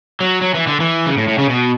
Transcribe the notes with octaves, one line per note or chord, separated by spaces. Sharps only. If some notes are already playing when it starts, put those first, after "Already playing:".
F#3
F#3
E3
D3
E3
C#3
A2
A2
C#3
B2